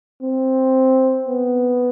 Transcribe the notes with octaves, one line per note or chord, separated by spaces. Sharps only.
C4
B3